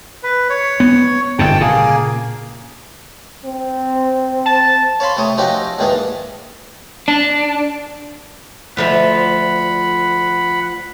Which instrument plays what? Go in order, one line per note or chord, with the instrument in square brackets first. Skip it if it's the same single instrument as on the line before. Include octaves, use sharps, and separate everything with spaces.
[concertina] B4
C#5
[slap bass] B3
[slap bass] G1 G#2 C3 [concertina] G5 A5
[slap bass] A#2 C#3 [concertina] A#3 G#4
[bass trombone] C4
[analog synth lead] A5
[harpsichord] C#5 F5 B5 C6
C3 A3 C#5 D#6
F3 C4 C#4 D#4 F#4 G4
D#2 G#2 D#3 E3 D4 G#4
[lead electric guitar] D4
[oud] D2 F3 E5 [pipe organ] F#5 B5